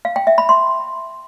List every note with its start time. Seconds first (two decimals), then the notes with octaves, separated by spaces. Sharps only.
0.05 F5
0.16 G5
0.27 E5
0.38 B5
0.49 C6